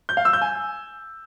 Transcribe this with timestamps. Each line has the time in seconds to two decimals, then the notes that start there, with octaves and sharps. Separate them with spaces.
0.09 G6
0.17 F5
0.25 E6
0.33 G6
0.41 G#5